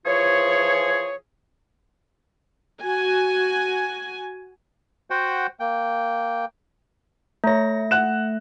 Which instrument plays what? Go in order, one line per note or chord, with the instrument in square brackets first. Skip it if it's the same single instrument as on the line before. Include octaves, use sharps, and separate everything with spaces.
[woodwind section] E3 F3 F4 G#4 C#5
[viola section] F#4 G#5
[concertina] F#4 C5 F#5 G5
A#3 G5
[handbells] A3 A#6 [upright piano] C#5 A#5
[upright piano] F#5 F#6 E7